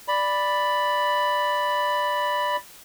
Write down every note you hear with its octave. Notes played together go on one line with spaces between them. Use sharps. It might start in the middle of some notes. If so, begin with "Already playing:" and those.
D5 B5